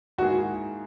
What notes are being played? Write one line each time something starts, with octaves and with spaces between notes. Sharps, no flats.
G#2 D#3 A#3 E4 F#4 G#4